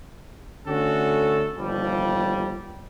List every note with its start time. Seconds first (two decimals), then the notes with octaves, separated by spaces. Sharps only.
0.67 D3 A3 C#4 F#4 A4
1.58 G1 D#2 F3 G3